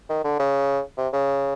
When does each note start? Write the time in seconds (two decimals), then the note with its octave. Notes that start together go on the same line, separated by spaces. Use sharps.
0.09 D#3
0.24 D3
0.39 C#3
0.98 C3
1.13 C#3